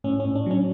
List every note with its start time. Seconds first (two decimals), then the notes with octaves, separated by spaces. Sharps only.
0.04 A2 C#4
0.20 C#4
0.25 A2
0.35 D4
0.46 F#3 C#4